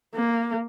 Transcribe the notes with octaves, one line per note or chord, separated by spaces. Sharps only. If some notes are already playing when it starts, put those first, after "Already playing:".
A#3